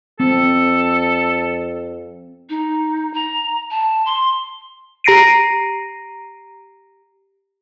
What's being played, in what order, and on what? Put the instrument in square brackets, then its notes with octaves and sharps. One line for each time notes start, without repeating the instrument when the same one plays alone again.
[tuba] F2 [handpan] C4 [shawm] A4
[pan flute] D#4
A#5
A5
C6
[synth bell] G4 A#5 A#6 C7 D7 D#7